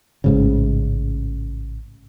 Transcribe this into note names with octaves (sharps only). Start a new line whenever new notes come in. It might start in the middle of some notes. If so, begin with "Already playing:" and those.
A1 G#2 C#3